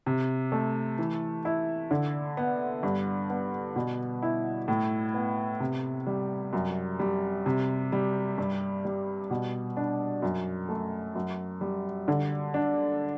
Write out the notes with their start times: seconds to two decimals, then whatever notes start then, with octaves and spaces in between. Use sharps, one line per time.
0.06 C3
0.52 A3
0.99 E3
1.45 E4
1.91 D3
2.37 B3
2.83 G2
3.30 B3
3.76 B2
4.23 E4
4.68 A2
5.14 B3
5.60 C3
6.07 G3
6.53 F#2
6.99 G3
7.46 C3
7.92 G3
8.38 G2
8.85 G3
9.30 B2
9.77 D4
10.22 F#2
10.69 A3
11.15 F#2
11.61 G3
12.08 D3
12.54 D4